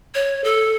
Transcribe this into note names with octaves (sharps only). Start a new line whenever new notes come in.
C#5
A4